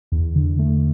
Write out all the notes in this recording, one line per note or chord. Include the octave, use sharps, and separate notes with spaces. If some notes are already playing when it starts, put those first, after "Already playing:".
E2
D3
A3